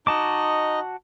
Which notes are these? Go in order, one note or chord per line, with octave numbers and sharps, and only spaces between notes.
D#4 F#4 D#5 A5 D6